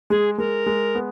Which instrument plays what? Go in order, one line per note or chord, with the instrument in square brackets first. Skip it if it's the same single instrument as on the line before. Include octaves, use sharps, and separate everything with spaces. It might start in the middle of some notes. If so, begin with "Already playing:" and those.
[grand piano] G#3 [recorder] G#4
[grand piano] G#3 [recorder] A#4
[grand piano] G#3
B3